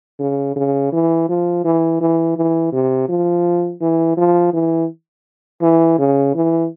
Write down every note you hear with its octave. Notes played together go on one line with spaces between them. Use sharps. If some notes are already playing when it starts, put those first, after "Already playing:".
C#3
C#3
E3
F3
E3
E3
E3
C3
F3
E3
F3
E3
E3
C#3
E3